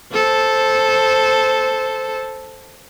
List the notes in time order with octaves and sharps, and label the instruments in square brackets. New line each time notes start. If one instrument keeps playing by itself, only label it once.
[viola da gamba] A4 C5